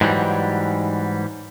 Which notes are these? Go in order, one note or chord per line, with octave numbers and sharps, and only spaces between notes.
G#2 E3 F#3 G3